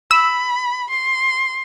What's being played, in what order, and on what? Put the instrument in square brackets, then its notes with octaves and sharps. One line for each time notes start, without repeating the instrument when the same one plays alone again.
[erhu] B5 [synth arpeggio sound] E6
[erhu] C6